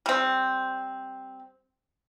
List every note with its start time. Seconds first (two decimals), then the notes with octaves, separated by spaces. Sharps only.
0.06 G3 C4